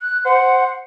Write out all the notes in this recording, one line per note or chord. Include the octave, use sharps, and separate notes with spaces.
F#6
C5 F#5